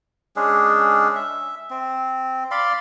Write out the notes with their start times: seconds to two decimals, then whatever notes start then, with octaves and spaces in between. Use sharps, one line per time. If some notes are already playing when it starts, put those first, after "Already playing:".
0.36 G#3 C#4 D4 G#4
1.16 E5
1.70 C4
2.51 D5 F5 B5 C6